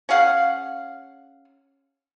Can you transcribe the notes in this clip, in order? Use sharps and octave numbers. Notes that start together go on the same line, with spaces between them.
C#4 G#4 F5 F#5